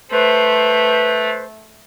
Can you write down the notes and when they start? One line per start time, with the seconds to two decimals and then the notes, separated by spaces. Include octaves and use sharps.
0.11 A3 B4 C5